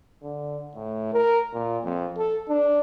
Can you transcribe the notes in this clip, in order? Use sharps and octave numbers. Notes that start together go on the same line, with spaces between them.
D3
A2
A#4
A#2
F2
A4
D4